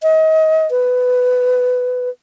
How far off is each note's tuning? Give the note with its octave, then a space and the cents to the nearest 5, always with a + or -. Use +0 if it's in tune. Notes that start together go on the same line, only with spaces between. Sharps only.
D#5 +30
B4 +15